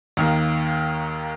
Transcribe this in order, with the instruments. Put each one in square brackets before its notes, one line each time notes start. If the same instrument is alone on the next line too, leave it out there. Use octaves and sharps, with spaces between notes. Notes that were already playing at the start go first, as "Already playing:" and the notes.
[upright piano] D#2 D#3 A#3